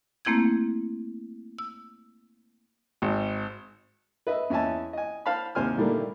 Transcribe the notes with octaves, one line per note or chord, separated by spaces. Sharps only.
A3 A#3 C4 E4 G6 G#6
E6
G#1
B4 D#5 E5
E2 C#4 D#5 E5 G#5 A5
D#5 G#5
C5 F5 A5 B5
D#2 C3 C5 G#5 F6
A#2 D3 D#3 G3 A3 A#3